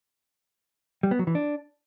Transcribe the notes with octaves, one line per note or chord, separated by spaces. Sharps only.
G3
B3
F#3
E3
D4